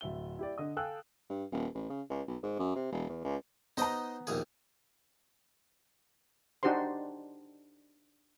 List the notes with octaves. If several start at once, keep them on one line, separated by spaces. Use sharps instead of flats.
D1 E5 G7
E4 G4 D5
D3 D#5 D#6
A4 F5 G5 G#5 E6 F#6
G2
D#1
A1
C#3
C#2
B1
G#2
F#2
C3
E1
E2
C#2
B3 D#4 C5 D#5 A#5
A#1 D#2 G#4
D4 D#4 F#4 G4 C5 C6